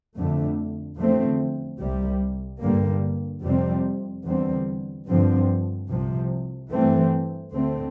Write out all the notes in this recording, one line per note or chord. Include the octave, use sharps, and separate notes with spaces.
F2 D3 A3
E2 D3 F3 A3 C4
C2 C3 G3
G2 D3 G3 A#3
F2 C3 G3 C4
E2 D3 G3 C4
G2 D3 F3 C4
C2 C3 F3
G2 E3 A3 C4
D2 D3 A3 C4